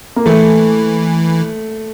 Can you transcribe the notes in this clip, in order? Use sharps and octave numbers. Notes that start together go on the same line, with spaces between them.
A#3
E3 A3